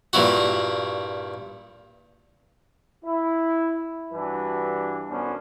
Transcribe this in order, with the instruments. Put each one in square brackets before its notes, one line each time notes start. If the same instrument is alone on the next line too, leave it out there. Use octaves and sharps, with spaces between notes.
[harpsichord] G2 A#2 E4 F#4
[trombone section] E4
G2 E3 G3 D4 F#4 B4
B1 F#2 B3 C#4 D4 C5